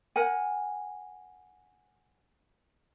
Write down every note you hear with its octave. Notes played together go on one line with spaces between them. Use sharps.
A#4 F#5 G#5